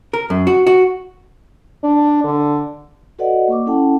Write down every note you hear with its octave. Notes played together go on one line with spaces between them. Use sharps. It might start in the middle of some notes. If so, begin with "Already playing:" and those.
A#4
F#2
F#4
F#4
D4
D3
F#4 A4 B4 D5 D#5 F#5
A#3 C#6 D6
C#4 E4 A4 F#5 G5 A5